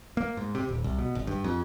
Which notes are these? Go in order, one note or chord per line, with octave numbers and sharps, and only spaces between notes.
A#3
G#2
C3
D#1
C2
B2
G#1
G2
F2